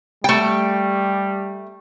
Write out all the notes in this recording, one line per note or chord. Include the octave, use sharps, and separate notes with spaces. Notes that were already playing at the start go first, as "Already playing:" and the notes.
G3 A3 G5